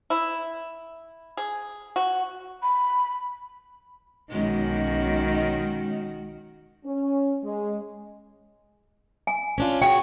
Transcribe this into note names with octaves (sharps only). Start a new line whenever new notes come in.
E4
G#4
F#4
B5
B1 D#3 G#3 C#4 F#4
C#4
G#3
G#5
C#4 D4 F4
F#4 G#4 C#5 G5